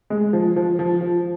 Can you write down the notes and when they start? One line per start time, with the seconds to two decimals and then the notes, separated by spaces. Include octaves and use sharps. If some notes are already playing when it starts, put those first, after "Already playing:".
0.10 G#3
0.33 F3
0.56 F3
0.79 F3
1.01 F3